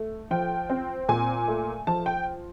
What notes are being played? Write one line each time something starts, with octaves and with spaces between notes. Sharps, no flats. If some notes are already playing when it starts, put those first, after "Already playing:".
Already playing: A3
F3 G5
C4
A#2 G#5
A3
F3 A5
G5